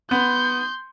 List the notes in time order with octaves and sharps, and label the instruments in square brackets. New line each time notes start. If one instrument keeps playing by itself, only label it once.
[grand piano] B3 [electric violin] C6 G6